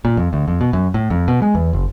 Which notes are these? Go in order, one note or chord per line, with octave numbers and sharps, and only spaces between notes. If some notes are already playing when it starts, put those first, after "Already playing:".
A#2
F2
D2
F2
B2
F#2
A2
F2
B2
G#3
E2
F#1